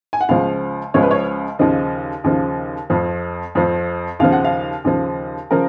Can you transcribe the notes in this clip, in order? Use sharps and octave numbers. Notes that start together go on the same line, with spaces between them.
G#5
F#5
C#2 C#3 F3 F5
C#2 C#3 F3 C#5
B4
C#5
D#2 C#3 F3 D#5
D#2 C#3 F3
F2 F3
F2 F3
D#2 C#3 F3 F5
F#5
F5
D#2 C#3 F3
C#3 F3 A#4